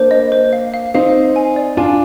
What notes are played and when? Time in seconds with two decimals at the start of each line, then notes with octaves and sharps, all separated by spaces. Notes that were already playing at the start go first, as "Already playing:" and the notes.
Already playing: A#3 D4 C5
0.11 D#5
0.32 C5
0.53 F5
0.74 F5
0.94 C4 D#4 F5
1.15 F5
1.36 G#5
1.56 D5
1.77 D4 F4 G#5